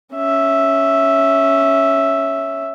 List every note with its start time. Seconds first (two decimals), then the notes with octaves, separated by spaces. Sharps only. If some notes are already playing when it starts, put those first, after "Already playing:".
0.15 C#4 E5